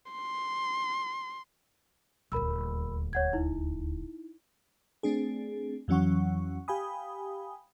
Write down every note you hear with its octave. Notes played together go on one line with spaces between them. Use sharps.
C6
D#1 D2 A#4 B5 E6
C#5 F#5 G#6
D#4 E4
A3 C4 D4 G#4
F2 E3 F#3 C#4 F#5 C#6
G4 F5 G5 G#5 B5 D#6